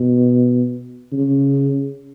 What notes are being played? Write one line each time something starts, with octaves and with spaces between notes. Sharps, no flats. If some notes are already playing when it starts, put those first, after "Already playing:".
Already playing: B2
C#3